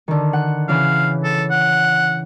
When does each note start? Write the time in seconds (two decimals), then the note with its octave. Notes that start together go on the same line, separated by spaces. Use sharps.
0.08 D3 D#3
0.33 F#5
0.69 C#3 E3 F5
1.24 A4
1.51 F#5